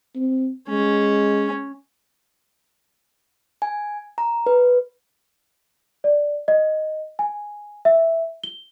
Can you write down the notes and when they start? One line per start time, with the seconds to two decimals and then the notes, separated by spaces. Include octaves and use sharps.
0.16 C4
0.69 G#3 C#4
3.62 G#5
4.18 A#5
4.46 B4
6.04 D5
6.48 D#5
7.19 G#5
7.85 E5
8.44 G7